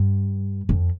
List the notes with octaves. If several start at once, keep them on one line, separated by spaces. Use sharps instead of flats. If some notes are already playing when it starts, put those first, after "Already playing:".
Already playing: G2
F2